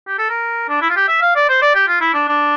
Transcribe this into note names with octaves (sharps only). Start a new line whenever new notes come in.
G4
A4
A#4
D4
E4
F4
G4
E5
F5
D5
C5
D5
G4
F4
E4
D4
D4